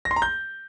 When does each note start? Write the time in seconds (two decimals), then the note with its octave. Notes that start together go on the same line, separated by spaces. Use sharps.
0.05 A#6
0.11 C6
0.16 A#5
0.22 G6